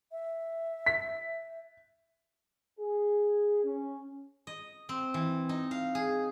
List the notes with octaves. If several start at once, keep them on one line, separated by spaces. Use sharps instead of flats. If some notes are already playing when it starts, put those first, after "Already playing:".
E5
B6
G#4
C#4
D#5
C4
E3
D#4
F5
G#4